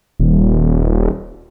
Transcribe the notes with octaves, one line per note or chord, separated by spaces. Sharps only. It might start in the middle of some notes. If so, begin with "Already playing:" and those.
D#1